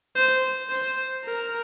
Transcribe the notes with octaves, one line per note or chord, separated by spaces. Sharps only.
C5
C5
A#4